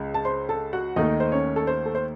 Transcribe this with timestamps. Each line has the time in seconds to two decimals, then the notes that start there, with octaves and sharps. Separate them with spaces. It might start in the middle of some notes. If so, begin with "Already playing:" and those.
Already playing: C#2 C#3 G#3
0.14 A5
0.25 C5 C6
0.49 A4 A5
0.73 F#4 F#5
0.96 D#2 D#3 A3 D#4 D#5
1.20 C5
1.32 C#4 C#5
1.56 A4
1.67 C5
1.86 A4
1.95 C5